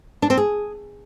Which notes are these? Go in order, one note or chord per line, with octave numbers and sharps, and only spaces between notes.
D4
C4
G#4